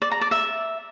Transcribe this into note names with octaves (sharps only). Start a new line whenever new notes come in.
D5
A#5
D5
E5